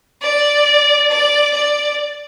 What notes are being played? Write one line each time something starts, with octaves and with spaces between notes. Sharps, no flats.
D5
D5
D5